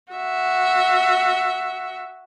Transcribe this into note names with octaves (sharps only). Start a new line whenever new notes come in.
F#4 E5